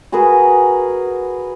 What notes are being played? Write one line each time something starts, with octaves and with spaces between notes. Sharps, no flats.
F#4 G#4 A#4 B4